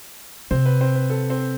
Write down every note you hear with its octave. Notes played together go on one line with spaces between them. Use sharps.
C3 C4 C5
B4
C4 C5
B4
A4
C4 C5